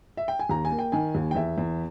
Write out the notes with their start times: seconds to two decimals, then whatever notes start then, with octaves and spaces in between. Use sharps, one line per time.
0.17 E5
0.28 G5
0.39 G#5
0.49 D#2 A#5
0.65 G#5
0.72 A#3
0.79 G5
0.92 D#3 G#5
1.15 D#2
1.31 G5
1.35 E2 E5
1.58 E2